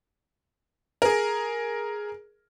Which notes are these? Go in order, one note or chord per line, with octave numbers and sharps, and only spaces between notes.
G#4 A#4